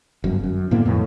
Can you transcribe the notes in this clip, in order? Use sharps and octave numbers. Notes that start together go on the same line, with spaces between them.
G1 F#2
F#2
A2 D3 A#3 B3
F2 A2